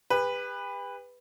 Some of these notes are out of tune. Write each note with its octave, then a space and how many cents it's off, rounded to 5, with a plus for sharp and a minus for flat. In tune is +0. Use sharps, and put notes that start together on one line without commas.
G4 +45 B4 +0